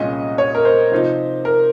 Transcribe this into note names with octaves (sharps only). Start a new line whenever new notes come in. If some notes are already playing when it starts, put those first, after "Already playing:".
Already playing: C2 A#2 F3 G#3 C#4 D#5
C#5
A#4
C5
C3 F3 C4 D#4
A#4